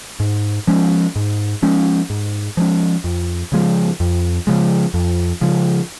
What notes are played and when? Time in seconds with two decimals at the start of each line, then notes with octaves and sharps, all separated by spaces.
0.20 G#2
0.67 F3 G#3 C#4
1.16 G#2
1.62 F3 G#3 C#4
2.10 G#2
2.57 F3 G#3 C#4
3.04 F2
3.52 C#3 F3 G#3
4.00 F2
4.47 C#3 F3 G#3
4.94 F2
5.41 C#3 F3 G#3